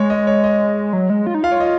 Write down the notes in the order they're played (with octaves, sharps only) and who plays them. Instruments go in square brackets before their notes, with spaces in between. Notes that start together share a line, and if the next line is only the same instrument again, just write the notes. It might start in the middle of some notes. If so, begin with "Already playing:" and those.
Already playing: [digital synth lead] G#3 [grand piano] C#5
[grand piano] D#5
C#5
D#5
[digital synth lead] F#3
G#3
F4
D#4
[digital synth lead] F4 [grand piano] F5
[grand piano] C#5
D#5